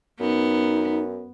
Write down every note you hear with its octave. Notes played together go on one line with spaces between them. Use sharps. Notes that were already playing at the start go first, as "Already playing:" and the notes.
F#2 B3 D#4